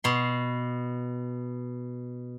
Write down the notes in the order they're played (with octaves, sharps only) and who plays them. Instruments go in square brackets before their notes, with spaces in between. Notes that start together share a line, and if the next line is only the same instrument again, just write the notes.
[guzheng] B2 C6